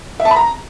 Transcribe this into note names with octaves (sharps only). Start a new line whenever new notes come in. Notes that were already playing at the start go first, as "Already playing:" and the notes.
E5
A5
B5
A#5